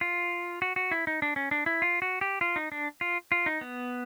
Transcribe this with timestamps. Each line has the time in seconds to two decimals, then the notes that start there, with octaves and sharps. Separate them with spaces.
0.01 F4
0.62 F#4
0.76 F#4
0.91 E4
1.07 D#4
1.22 D4
1.36 C#4
1.51 D4
1.66 E4
1.82 F4
2.02 F#4
2.21 G4
2.41 F4
2.56 D#4
2.72 D4
3.01 F4
3.32 F4
3.46 D#4
3.61 B3